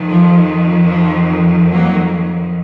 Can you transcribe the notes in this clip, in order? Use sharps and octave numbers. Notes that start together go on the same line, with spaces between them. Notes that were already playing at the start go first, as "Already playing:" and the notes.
Already playing: F2 D#3
F3
F3
F#3 A#3